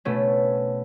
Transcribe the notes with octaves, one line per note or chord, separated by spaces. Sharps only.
B2 A3 C#4